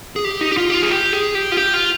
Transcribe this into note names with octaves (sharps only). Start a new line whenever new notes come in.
G#4
G4
D#4
G4
F4
G4
F4
G#4
G4
G#4
G4
F4
G4
F4